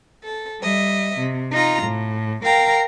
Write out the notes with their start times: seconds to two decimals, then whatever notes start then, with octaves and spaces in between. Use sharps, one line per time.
0.22 A4
0.62 G3 D#5 E5
1.19 C3
1.52 D#4 F4 A#5
1.84 A2
2.45 A#4 F5 G5 A#5